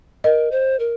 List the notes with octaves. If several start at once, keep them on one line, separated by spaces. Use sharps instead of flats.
A#4 D#5
C5
A#4